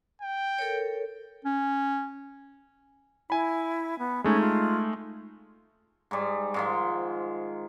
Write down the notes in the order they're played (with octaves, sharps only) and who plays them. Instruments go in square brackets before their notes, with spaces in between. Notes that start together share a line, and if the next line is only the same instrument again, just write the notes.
[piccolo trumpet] G5
[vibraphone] A4 A#4 C#5
[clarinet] C#4
[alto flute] E4 [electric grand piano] G#5 B5
[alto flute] B3
[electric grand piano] G#3 A3 D#4 [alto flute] C#4
[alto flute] F4
[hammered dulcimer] G#2 G3
G#2 D#3 F3